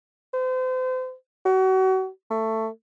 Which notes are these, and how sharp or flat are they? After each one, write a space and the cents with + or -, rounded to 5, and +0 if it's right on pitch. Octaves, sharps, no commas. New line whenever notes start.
C5 -35
F#4 +35
A3 +15